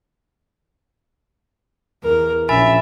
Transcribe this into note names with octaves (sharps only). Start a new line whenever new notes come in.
E2 A#4
A#1 C#4 E5 G#5 B5 A6